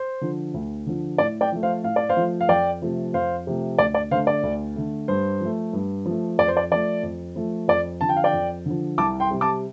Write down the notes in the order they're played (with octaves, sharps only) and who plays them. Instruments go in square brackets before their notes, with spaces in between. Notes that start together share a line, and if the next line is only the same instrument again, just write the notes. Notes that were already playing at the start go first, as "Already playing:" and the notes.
Already playing: [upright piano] C5
D3 F3
D2
D3 F3
A2 D5
D5 G5
F3 A3
C5 F5
A2 F5
D5
C5 F5
F3 A3
F5
F2 D5 G5
C3 F3 A3
F2 C5 F5
C3 F3 A3
D2 D5
D5
D3 A3 C5 F5
D5
D2
D3 A3
G2 C5
F3 A3
G2
F3 A3
F2 D5
C5
D5
F3 A3 D5
F2
F3 A3
F2 D5
D3 F3 A5
G5
F5
D5 G5
F2
D3 F3
C2 A5 D6
G5 C6
C3 G3
A5 D6